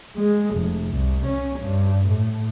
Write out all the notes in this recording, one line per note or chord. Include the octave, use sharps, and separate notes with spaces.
G#3
F1
C2
C#4
G2
A2